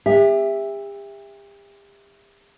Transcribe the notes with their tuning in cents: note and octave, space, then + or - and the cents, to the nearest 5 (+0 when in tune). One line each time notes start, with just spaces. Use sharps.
G4 +40 E5 +0